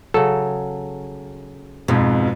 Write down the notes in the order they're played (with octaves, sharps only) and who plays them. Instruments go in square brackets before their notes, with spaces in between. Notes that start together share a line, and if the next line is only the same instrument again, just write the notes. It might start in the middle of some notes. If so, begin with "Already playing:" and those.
[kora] C#3 F#3 [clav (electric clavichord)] A4
[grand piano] F2 G#2 [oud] B2